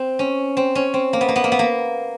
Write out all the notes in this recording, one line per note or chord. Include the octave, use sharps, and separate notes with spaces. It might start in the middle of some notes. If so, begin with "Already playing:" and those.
Already playing: C4
C#4
C4
C#4
C4
A#3
B3
A#3
B3
A#3
B3
A#3